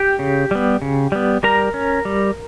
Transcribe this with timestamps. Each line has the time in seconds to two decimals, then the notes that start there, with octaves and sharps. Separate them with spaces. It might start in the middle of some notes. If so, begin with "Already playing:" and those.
Already playing: G4 G5
0.19 C#3
0.51 G3 B3
0.82 C#3
1.12 G3 B3
1.43 G3 A#4 A#5
1.74 C#4
2.05 G3